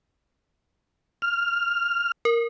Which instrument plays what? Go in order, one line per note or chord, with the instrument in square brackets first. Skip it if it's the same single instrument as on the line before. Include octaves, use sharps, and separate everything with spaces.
[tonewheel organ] F6
[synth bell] A#4